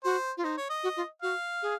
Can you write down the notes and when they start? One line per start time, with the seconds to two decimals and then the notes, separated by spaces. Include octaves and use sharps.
0.04 F#4 C5
0.37 F4
0.44 D#4 C5
0.58 C#5
0.70 D#5
0.83 F#4
0.97 F4
1.22 F#4 F5
1.62 G#4